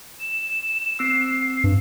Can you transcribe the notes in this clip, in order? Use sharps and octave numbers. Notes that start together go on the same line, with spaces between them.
E7
C4 E6 C7
G2